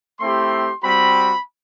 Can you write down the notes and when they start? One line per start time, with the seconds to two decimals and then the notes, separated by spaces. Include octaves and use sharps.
0.20 A3 C4 E4 G4 C6
0.84 G3 C4 F#4 B5